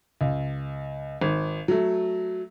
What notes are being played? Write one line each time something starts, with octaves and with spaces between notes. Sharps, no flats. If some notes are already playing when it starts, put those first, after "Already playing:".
C#2
G#1
F#3 A3